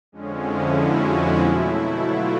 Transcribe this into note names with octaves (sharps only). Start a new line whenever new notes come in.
F2 D3 F3 G#3 C#4
E4
F#4
F4
B2 F#3 A3 E4
F4